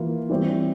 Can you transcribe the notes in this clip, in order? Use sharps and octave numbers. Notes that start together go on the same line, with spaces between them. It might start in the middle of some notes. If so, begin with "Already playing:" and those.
Already playing: E3 A#3 F4
E3 G3 C4 G4 C#5